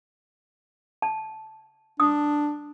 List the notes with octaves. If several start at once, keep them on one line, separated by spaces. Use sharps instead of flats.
A5
D4 D#6